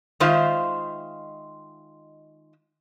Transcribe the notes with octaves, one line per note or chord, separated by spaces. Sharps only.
D#3 G#3 F4 C5 E5 F5